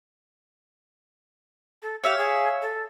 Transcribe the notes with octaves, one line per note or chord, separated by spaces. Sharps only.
A4
G4 C#5 E5 F5
G#4
A4